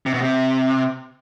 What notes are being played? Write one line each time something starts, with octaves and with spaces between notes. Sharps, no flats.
C3
B2
C3